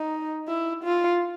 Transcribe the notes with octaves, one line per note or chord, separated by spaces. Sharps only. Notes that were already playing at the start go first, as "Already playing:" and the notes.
Already playing: D#4
E4
F4